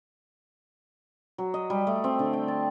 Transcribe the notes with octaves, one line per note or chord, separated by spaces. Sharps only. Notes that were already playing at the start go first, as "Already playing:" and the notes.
F#3
D#5
G3
A3
C4
D3
G5
A5